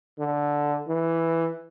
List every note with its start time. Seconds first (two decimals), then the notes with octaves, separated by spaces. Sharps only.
0.19 D3
0.88 E3